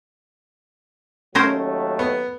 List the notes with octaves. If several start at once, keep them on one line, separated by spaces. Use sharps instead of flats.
D#2 F#3 A3 C#4 A#4 C5
B3